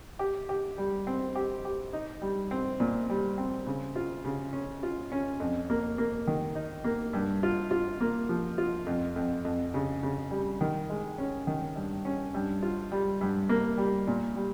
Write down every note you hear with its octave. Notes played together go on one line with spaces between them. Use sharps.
G4
G4
G3
C4
G4
G4
D#4
G3
C4
A#2
G3
C4
C#3
F4
C#3
C#4
F4
C#4
F2
A#3
A#3
D#3
D#4
A#3
G2
F4
F4
A#3
F3
F4
F2
F2
F2
C#3
C#3
G3
D#3
G#3
C#4
D#3
G2
C#4
G2
F4
G3
G2
A#3
G3
A#2
G3